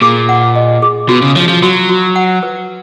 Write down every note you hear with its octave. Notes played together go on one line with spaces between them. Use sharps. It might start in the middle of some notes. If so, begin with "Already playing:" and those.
A#2 G#4
F#5
D#5
G#4
B2 F#4
C#3
F3 C#5
F3
F#3 F#4
F#4
F#5
B4